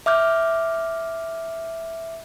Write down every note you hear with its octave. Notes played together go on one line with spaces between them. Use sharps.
E5 D6 F6 G6